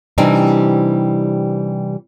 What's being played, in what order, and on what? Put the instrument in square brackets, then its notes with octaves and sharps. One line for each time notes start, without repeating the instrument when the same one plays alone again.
[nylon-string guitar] C3 E3 G3 C4 D4 D#4